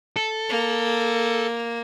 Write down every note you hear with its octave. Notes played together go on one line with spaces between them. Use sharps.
A4
A#3